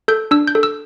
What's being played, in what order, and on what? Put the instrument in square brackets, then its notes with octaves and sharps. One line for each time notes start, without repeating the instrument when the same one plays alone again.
[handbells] A4 G6
D4 E6
G6
A4
E6